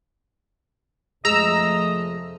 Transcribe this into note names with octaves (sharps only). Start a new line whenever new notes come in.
F1 F3 G#3 A3 D#5 A#5 E6